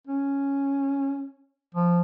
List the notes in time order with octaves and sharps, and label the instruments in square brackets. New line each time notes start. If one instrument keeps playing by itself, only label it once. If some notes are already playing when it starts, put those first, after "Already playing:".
[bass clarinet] C#4
F3